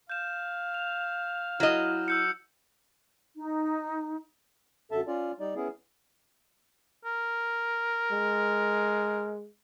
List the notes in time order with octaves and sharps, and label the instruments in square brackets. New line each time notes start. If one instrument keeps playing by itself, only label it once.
[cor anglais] F5 [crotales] G6 E7
[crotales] F7
[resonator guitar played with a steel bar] F#3 D#5 [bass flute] E4 [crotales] F6
[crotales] E6 G6 C#7
[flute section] D#4
[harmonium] F#2 D3 A4 E5 A5
C#4 F4 D5
G3 D#4 D5
B3 C#4 E4 G#4
[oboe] A#4
[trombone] G#3